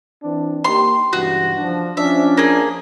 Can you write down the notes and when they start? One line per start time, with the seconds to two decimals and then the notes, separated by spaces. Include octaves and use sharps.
0.23 E3 C4 D4
0.64 A#3 D#4 G4 C6
1.13 C#2 G2 E3 F#4
1.57 F3 D4
1.97 F3 C#4 D4 E5
2.37 A#3 G#4